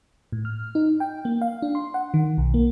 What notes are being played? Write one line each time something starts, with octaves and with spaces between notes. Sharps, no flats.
A2
F6
D#4
G5
A#3
F5
D4
C6
F#5
D#3
B1
A#3